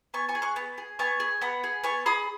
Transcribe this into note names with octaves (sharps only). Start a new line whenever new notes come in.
B3 G#5 C#6
G#5 C#6
G#4
C#6 F#6
B3
G#4
B3 G#5 C#6
G#4
B3 F#5 B5
G#4
B3 G#5 C#6
G#4 B5 D#6